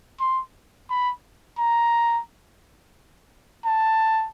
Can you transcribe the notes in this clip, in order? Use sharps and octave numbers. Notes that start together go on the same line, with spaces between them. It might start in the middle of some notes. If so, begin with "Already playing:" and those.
C6
B5
A#5
A5